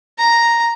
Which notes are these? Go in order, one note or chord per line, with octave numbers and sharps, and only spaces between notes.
A#5